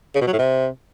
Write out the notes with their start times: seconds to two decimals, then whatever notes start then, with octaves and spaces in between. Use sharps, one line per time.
0.16 C#3
0.21 B2
0.27 F#3
0.33 A2
0.39 C3